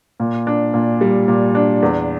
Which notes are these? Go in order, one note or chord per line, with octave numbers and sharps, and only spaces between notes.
A#2
D4
A#2
G3
A#2
D4
E2